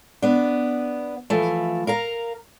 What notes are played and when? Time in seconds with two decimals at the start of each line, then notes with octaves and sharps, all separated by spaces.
0.22 B3 D4
1.30 E3 F3 A3
1.87 A#4 F5 A#5